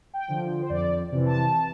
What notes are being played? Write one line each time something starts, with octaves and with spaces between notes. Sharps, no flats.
G5
D3 F3
C5
F2 D5
C3 E3
A5